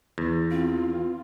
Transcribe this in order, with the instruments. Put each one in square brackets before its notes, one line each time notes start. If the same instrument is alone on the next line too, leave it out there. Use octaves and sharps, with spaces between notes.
[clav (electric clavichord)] E2
[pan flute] C4 [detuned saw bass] F4